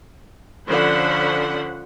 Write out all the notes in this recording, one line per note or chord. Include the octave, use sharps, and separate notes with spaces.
D3 F3 C#4 C5 F#5 B5